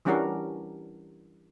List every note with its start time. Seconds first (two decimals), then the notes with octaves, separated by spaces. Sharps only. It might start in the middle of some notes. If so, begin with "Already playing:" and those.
0.05 E3 G3 C#4 D4 F#4 A#4